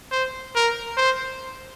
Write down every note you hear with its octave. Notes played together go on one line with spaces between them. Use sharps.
C5
A#4
C5